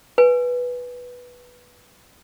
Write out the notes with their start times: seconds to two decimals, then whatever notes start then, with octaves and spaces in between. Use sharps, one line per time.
0.18 B4 G#5